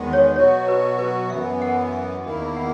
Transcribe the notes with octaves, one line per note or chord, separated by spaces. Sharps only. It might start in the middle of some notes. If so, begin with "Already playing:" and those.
Already playing: E2 D#3 G#3 B3
C#5
B2 F#3 B3 F#4 C#5
B4
B4
F#2 E3 B3 E5
F#5
E5
E2 D#3 A#3 E4 D#5
F#5